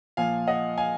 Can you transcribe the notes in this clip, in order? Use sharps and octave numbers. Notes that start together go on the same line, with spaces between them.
A#2 F3 F5 G#5
D#5 F#5
F5 G#5